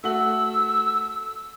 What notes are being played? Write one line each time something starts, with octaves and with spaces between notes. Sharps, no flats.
A3 F#4 E6 F#7